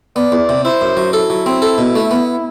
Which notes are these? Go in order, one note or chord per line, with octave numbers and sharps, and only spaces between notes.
B3 D5
E2
C3
E4 C5
F#2
F#3
E4 A4
F#3
C4
A4
B2
A3
B3